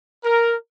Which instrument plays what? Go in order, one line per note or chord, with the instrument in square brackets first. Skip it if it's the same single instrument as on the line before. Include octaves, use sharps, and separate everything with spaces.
[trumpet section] A#4